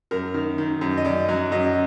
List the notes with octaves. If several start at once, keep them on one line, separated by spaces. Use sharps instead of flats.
F#2 A#4
D#3
D#3
F#2
D#5
F#2 D5
F#3
F#2 D#5